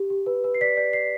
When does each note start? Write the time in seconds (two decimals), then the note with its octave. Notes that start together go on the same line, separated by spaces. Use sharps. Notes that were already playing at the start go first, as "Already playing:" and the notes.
Already playing: G4
0.10 G4
0.26 B4
0.44 B4
0.54 C7
0.61 D5 B6
0.77 D5
0.93 D5 C7